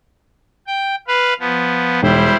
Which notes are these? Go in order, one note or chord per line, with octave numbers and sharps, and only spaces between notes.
G5
B4 F5
F3 B3
E1 G3 E4 C5